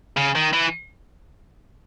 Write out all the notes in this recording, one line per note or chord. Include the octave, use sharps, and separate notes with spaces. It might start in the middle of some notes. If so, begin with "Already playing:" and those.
C#3
D#3
E3